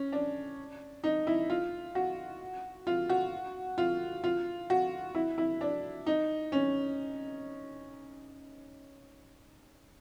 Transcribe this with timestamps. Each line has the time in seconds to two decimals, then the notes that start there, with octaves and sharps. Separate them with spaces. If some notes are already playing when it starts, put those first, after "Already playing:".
Already playing: C#4
0.12 D4
1.04 D#4
1.27 E4
1.50 F4
1.95 F#4
2.87 F4
3.09 F#4
3.78 F4
4.24 F4
4.70 F#4
5.15 E4
5.38 E4
5.61 D4
6.06 D#4
6.52 C#4